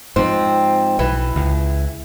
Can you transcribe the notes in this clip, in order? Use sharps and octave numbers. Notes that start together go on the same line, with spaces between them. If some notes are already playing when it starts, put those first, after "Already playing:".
G#2 F3 C4
B1 E3
C#2